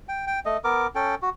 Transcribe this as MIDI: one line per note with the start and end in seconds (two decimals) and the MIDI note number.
0.09 0.25 79
0.27 0.39 79
0.45 0.57 57
0.45 0.57 75
0.64 0.87 59
0.64 0.87 70
0.64 0.87 86
0.95 1.15 61
0.95 1.15 69
0.95 1.15 79
1.22 1.30 66